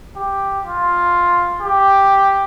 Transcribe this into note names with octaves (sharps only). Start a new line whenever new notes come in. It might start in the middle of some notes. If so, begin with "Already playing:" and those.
G4
F4
G4